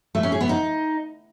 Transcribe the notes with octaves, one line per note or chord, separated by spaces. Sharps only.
A3
C#4
G#4
B3
D#4